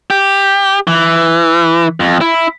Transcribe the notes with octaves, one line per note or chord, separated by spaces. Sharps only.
G4
E3
F2
E4